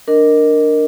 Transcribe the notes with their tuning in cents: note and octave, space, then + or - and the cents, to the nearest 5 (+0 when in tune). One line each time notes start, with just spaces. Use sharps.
D4 +0 A#4 -5 D#5 +0